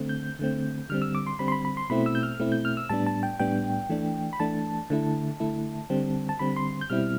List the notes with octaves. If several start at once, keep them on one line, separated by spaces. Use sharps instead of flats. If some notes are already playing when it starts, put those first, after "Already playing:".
Already playing: D3 A3 C4
G6
D3 A3 C4
D3 G3 C4 F6
E6
D6
C6
D3 G3 C4 B5
C6
B5
B5
C6
B2 A3 C4 E4 B5
E6
G6
F6
B2 A3 C4 E4
G6
F6
E6
A2 G3 B3 D4 A5
A5
G5
A2 G3 B3 D4 G5
E3 A3 D4
B5
E3 A3 D4 A5
D3 A3 E4
D3 A3 E4
D3 G3 C4
A5
D3 G3 C4 B5
C6
G6
B2 G3 C4 E4 F6